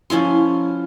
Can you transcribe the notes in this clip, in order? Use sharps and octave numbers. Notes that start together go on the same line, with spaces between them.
F3 C#4 E4 C6